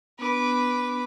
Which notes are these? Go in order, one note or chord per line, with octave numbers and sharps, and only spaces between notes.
B3 D4 B4 D6